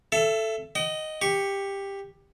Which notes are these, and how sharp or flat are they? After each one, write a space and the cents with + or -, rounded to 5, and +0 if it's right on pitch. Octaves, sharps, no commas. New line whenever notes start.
A4 +0 E5 +25
D#5 +0 G5 -45
G4 +10 C#6 +0